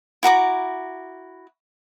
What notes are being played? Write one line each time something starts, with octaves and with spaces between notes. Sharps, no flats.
E4 F#4 A#5 D6